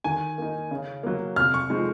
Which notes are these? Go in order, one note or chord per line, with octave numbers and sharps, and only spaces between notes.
D#3 G#5
A#3 D#4
C#3
F#3 A#3
C3 F6
C#6
F3 G#3 C4 D#4